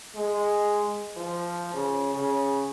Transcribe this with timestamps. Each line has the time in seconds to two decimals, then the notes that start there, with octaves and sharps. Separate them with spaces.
0.16 G#3
1.16 F3
1.74 C#3
2.14 C#3